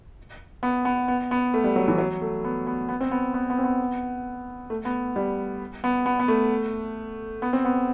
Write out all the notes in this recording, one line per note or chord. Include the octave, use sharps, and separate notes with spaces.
B3
B3
B3
B3
A3
G3
F#3
E3
F#3
A3
B3
B3
B3
C4
B3
B3
B3
C4
B3
A3
B3
G3
B3
B3
B3
A3
B3
C4
B3